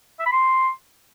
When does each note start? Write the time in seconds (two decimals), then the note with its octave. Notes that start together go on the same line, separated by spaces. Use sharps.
0.20 E5
0.26 B5
0.32 C6